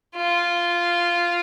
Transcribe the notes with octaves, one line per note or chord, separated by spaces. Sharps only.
F4